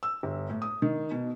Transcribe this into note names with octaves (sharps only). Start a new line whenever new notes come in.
E6
G1
A2
D#6
D#3
B2